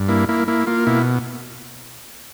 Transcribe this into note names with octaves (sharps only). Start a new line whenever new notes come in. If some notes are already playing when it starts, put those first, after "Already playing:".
Already playing: G2
A#3 E4
A#3 E4
A#3 E4
A#3 F4
B2 E4